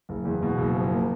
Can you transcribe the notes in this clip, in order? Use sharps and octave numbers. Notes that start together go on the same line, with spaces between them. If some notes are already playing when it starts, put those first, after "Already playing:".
F#1
E2
B2
F#1
F3
A#3